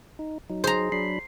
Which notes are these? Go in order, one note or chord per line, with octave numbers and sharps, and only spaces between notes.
D#4
F#3 D#4
G#4 C5 A#5
F#3 D4 B5 C7